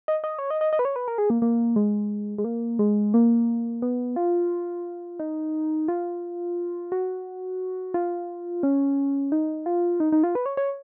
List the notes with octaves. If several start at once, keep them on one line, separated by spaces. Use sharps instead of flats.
D#5
D#5
C#5
D#5
D#5
D#5
B4
C#5
B4
A#4
G#4
A#3
A#3
G#3
G#3
A#3
G#3
A#3
B3
F4
D#4
F4
F#4
F4
C#4
D#4
F4
D#4
D#4
F4
B4
C#5
C#5